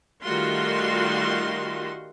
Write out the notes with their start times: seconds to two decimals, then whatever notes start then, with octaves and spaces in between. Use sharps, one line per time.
0.22 D#3 G3 A3 F4 F#4 C6